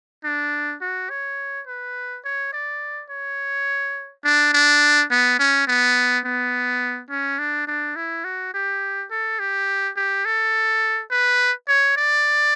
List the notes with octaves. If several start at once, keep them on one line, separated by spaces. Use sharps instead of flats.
D4
F#4
C#5
B4
C#5
D5
C#5
D4
D4
B3
C#4
B3
B3
C#4
D4
D4
E4
F#4
G4
A4
G4
G4
A4
B4
C#5
D5